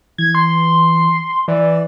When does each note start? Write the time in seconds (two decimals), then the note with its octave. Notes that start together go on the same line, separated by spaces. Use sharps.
0.18 E3 G#6
0.35 C6
1.48 E3 D5